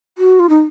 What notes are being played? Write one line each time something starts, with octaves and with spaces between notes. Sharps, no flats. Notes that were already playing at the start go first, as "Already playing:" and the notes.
F#4
F4
D#4